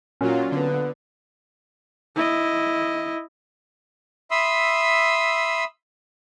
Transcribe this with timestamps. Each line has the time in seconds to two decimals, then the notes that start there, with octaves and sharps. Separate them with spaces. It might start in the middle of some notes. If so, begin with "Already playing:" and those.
0.21 A#2 F#3 C#4 F4
0.52 D3 B3
2.16 E4 D#5
4.31 E5 B5 C6 D#6 E6